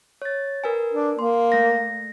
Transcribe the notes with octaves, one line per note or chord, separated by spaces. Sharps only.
C#5 A6
A#4 B4 G#5
D4
A#3 C6
A3 A#6